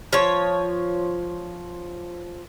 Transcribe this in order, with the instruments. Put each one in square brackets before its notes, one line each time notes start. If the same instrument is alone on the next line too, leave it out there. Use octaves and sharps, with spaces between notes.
[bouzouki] F3 C#5